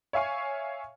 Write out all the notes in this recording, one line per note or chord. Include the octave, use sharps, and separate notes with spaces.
C#5 E5 F5 G#5 C#6